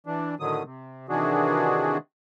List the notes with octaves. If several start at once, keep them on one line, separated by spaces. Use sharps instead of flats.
E3 D4
A2 D3 D#3 F#3 D#6
C3
C3 D#3 E3 D4 F#4 G#4